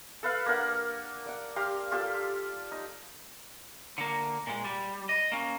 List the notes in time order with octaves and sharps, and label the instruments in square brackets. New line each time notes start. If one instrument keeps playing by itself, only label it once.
[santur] A4 B4 F5
A#3 D4 A#4 F#5
D5 F#5
G4 F5 A#5 C6
F4 G4 A4
D#4
[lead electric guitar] D3 A#3
A#2 G#3
G3
D#5
A#3 C#4